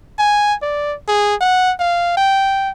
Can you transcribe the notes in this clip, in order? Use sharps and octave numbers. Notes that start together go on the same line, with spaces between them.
G#5
D5
G#4
F#5
F5
G5